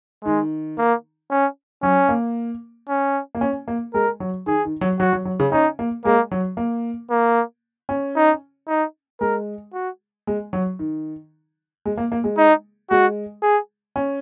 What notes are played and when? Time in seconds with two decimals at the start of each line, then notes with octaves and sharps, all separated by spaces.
0.24 D#3 G#3
0.78 A#3
1.31 C#4
1.83 F#3 C#4
2.09 A#3
2.89 C#4
3.35 A#3
3.41 C#4
3.68 A#3
3.94 G#3 A#4
4.20 F#3
4.46 D#3 G#4
4.65 D#3
4.81 F#3
4.99 F#3 F#4
5.13 F#3
5.25 F#3
5.40 C#3
5.52 C#4 D#4
5.79 A#3
6.05 G#3 A#3
6.31 F#3
6.57 A#3
7.10 A#3
7.89 C#4
8.16 D#4
8.68 D#4
9.21 G#3 A#4
9.74 F#4
10.27 G#3
10.53 F#3
10.79 D#3
11.86 G#3
11.98 A#3
12.12 A#3
12.24 G#3
12.38 D#4
12.91 G#3 F#4
13.43 G#4
13.96 C#4